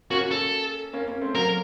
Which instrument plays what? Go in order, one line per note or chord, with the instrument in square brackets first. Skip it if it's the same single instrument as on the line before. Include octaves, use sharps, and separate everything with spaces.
[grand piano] A#3 C#4 [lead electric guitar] F#4
[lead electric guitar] A4
[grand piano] A#3 C#4
A#3 C#4
A3 C4
[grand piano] F#3 A#3 [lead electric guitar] A#4